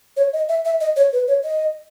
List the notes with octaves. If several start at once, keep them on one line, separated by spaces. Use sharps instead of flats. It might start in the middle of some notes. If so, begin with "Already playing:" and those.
C#5
D#5
E5
E5
D#5
C#5
B4
C#5
D#5